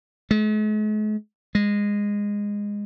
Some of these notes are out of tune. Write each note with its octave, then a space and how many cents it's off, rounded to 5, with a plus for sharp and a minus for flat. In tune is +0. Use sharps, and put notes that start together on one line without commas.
G#3 +45
G#3 -15